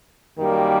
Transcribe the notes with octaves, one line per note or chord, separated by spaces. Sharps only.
F#2 D#3 G3 A#3